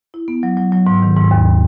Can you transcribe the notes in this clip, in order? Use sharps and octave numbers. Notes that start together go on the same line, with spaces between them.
E4
B3
F#3
F#3
F#3
G#2
D#3
G#2
D#2